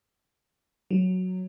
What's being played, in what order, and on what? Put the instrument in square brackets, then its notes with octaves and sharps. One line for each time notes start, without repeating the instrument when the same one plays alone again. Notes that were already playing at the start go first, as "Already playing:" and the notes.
[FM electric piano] F#3